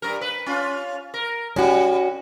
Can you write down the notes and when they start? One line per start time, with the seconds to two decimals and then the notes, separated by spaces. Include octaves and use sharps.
0.02 G2 A#4
0.21 B4
0.46 C#4 F4
1.14 A#4
1.56 G3 C#4 F#4